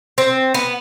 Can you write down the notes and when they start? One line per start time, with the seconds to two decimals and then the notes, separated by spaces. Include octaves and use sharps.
0.18 C4
0.54 B3